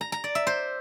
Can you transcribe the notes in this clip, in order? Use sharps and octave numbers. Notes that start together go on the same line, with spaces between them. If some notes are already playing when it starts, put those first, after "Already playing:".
A#5
A#5
D5
E5
C5